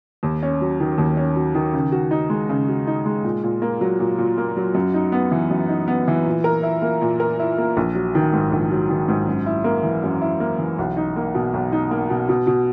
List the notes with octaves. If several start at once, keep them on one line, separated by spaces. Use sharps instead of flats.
D#2
C#4
F#3
D#3
D#2
C#4
F#3
D#3
C#3
F#4
D#4
G#3
C#3
F#4
D#4
G#3
A#2
A#2
A#3
F#3
A#2
A#2
A#3
F#3
F#2
D#4
B3
E3
F#2
D#4
B3
E3
A#2
A#4
E4
A#3
A#2
A#4
E4
A#3
A#1
F#3
D#3
G#2
A#1
F#3
D#3
G#2
F#2
E4
A#3
E3
F#2
E4
A#3
E3
B1
D#4
A#3
B2
B1
D#4
A#3
B2
B2
B2